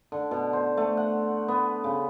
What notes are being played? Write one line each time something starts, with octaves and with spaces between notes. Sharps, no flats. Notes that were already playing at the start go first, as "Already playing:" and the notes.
D3
B2
C5
A3
F#5
B3
C#3